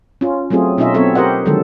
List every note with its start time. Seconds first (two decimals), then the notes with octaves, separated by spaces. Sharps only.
0.21 C#4 F4
0.50 F#3 A3 C4 F4 G#4
0.78 B2 C#4 D#4 F4 D#5 E5
0.94 F#3 B3 C4 A4 C#5 E5
1.15 G4 A#4 C5 D#5 F#5
1.46 D3 D#3 F3 F#3 G#3 A4